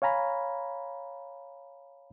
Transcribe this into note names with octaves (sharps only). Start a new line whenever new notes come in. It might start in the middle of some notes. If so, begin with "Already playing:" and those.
C#5 F5 G#5 A#5 B5